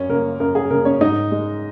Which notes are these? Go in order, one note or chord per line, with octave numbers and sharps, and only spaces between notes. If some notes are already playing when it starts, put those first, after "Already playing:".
Already playing: F#2 C#4 C#5
C#3 A#3 A#4
F#2 A#4
G#4
C#3 A#3 A#4
C#4 C#5
G#2 D#4 D#5
G#3